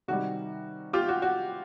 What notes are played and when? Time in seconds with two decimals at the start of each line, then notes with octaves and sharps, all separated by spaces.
0.08 C3 D#3 G3 F#4
0.93 F4 G4
1.08 F#4
1.22 F#4